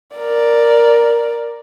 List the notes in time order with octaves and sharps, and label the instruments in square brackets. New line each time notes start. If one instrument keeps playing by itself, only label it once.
[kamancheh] A#4 D5